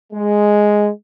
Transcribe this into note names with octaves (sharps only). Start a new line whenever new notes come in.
G#3